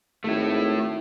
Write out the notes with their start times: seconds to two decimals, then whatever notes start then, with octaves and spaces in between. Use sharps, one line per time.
0.24 G#1 A3 E4